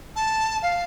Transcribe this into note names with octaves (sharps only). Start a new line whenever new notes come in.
A5
F5